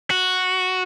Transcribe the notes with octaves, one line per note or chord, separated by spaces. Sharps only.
F#4